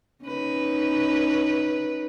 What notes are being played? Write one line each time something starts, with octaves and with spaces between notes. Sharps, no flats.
C#4 D#4 B4